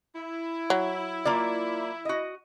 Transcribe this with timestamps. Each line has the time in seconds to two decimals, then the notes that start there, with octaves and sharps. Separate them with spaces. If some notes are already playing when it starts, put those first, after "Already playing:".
0.16 E4
0.70 F#3
1.25 A#3 F4 D5
2.05 F#4 D#5